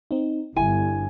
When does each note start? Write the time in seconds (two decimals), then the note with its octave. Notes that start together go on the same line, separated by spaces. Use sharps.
0.11 C4 D#4
0.56 G1 E4 G#5